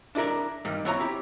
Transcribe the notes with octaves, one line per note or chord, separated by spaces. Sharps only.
D4 E4 G#4 A#4 D5
G2 D#3 G3
B3 E4 C#5 G#5 A#5
C4 E4 G4